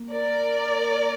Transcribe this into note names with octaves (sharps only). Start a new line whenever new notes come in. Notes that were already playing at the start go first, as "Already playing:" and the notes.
Already playing: A#3
A#4 D5